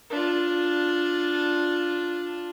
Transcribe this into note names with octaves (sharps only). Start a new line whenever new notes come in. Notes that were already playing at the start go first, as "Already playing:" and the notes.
D4 F4